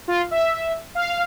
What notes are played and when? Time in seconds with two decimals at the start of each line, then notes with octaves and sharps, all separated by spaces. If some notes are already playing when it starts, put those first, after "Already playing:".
0.08 F4
0.31 E5
0.95 F5